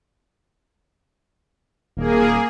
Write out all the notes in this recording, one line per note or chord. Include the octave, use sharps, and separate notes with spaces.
D#1 A#3 G#4